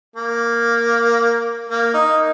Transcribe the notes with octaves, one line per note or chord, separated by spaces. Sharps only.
A#3
A#3
D#4